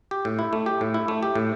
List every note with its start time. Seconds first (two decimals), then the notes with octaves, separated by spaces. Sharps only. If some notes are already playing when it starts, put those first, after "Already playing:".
0.11 G4
0.25 A2
0.39 E4
0.53 A3
0.66 G4
0.81 A2
0.94 E4
1.08 A3
1.23 G4
1.35 A2